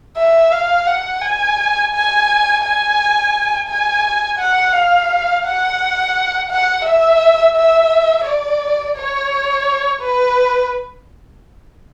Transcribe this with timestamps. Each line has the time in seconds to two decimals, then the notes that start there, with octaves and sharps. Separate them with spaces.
0.17 E5
0.52 F5
0.86 F#5
1.21 G#5
1.93 G#5
2.63 G#5
3.68 G#5
4.38 F#5
4.73 F5
5.44 F#5
6.49 F#5
6.85 E5
7.56 E5
8.25 D5
8.96 C#5
10.01 B4